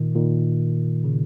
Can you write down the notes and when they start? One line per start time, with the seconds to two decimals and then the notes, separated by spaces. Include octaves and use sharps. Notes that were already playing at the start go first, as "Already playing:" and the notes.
Already playing: A#2 D#3
0.16 A#2 D#3
1.04 C#3